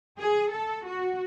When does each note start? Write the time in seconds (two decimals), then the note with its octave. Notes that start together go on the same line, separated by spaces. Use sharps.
0.18 G#4
0.51 A4
0.86 F#4